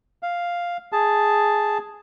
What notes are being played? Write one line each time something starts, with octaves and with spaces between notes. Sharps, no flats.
F5
G#4 A5